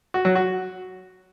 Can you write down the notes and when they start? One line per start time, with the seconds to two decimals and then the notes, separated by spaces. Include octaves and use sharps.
0.14 F#4
0.25 F#3
0.35 F#4